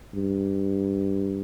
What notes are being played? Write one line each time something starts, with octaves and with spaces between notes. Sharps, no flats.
G2